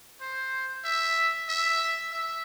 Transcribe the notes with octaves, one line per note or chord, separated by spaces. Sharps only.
C5
E5
E5
E5